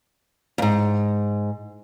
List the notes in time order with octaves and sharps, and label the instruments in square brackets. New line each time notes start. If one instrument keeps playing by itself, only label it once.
[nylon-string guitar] F2 G#2